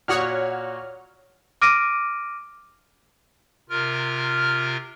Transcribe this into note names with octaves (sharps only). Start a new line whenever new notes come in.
A#2 F#4 C#5 F#5 D#6 F6
D6 F6 A#6 D7 D#7
C3 F4 A#4 F6